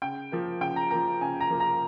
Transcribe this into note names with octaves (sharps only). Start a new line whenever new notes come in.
C#3 G5
F3 A#3
C#3 G5
A#5
F3 A#3 A#5
C#3 G#5
A#5
F3 A#3
A#5